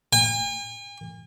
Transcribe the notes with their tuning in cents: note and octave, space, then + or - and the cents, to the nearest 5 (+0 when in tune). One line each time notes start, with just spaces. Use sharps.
G#5 -45